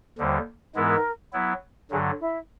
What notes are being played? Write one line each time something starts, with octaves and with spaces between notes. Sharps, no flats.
D#2 D3 G3 C5
G#2 E3 G#3 B3 E4 A#4
F#3 B3 E4
G2 D3 F#3 G#4
E4